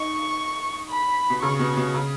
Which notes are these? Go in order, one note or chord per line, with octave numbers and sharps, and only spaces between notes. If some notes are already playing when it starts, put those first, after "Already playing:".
Already playing: D#4 C#6
B5
B2
C#3 C#6
B2
B2
C#3